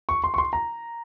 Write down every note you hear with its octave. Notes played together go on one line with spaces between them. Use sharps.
C#6
C6
C#6
C6
A#5